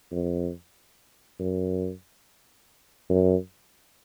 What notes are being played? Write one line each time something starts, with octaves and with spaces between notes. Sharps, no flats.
F2
F#2
F#2